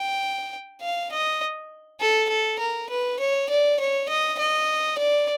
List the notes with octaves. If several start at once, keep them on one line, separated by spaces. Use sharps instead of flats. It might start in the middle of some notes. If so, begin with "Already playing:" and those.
Already playing: G5
F5
D#5
A4
A4
A#4
B4
C#5
D5
C#5
D#5
D#5
D5